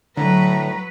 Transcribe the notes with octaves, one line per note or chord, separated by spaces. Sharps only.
A2 D3 F#3 B4 A#5